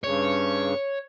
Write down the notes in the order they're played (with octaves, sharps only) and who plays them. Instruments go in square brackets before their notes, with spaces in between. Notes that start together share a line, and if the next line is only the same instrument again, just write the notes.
[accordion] G2 C#3 [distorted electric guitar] C#5